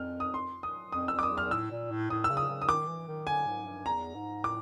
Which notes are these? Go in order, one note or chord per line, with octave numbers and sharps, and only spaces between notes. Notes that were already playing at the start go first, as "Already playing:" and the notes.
Already playing: F2 F6
D#6
C6
D#6
F2 D#6
F2 E6
D6
D#6
E2
F6
A2 E6
A#2
A2
A2 D#6
E6
C#3
D#6
C#3
D#6
D#3 D6
E3
D#3
D3 G#5
G#2
G2
E2 A#5
G#2
A2 D6